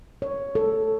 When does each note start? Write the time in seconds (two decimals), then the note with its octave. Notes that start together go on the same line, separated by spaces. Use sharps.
0.22 C#5
0.55 A4